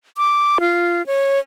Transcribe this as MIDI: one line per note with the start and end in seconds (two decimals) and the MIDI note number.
0.17 0.58 86
0.61 1.05 65
1.06 1.39 73